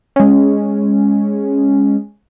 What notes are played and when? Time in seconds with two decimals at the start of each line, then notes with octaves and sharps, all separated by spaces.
0.16 G#3 C#4